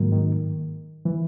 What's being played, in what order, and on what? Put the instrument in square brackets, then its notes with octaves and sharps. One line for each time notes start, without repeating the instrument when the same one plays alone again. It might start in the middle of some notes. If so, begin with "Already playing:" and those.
Already playing: [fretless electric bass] G#2 F#3 A#3 [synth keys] D#3
[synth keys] D#3
E3